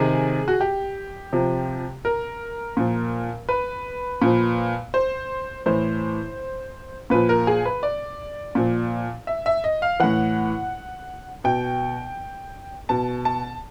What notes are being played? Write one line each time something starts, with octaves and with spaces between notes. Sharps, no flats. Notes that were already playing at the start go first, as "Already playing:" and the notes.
Already playing: C3 D#3 G#4
F#4
G4
C3 F3
A#4
A#2 F3
B4
A#2 F3
C5
A2 E3 C5
A#2 F3 B4
A#4
G#4
B4
D5
A#2 F3
E5
E5
D#5
F5
A2 E3 F#5
B2 G5
B2 A5
A5